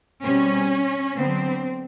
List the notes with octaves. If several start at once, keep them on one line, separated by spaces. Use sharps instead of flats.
B2 G3 C4 C#4
D3 F#3 B3 C4